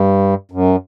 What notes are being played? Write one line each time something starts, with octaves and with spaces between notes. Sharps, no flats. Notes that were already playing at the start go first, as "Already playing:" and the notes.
Already playing: G2
F#2